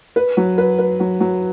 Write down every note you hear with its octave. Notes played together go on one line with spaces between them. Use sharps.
B4
F#3
B4
B4
F#3
F#3